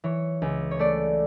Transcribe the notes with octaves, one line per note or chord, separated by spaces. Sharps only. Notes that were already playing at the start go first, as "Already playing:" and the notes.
E3 C#5
C#2
C#5
A3 D5